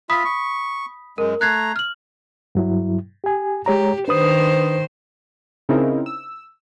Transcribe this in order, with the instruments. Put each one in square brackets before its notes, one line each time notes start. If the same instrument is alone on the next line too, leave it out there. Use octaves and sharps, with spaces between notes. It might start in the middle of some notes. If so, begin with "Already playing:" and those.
[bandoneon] F4 E5 [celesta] B5 D#6 B6
[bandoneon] C#6
[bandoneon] F#2 G#3 [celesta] A#4
[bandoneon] A3 A#5 [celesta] F#6 G#6 C7
[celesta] F6 F#7
[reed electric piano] G2 F#3 E4
G4 G#5
[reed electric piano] G#3 C#5 A#5 [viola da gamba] G4
[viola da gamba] D#3 C5 [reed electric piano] D4 B4 D#6
[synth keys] C#3 C4 D#4 E4 A#4
E6